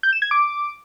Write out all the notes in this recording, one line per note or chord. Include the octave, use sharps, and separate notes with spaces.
G6
E7
G#6
D6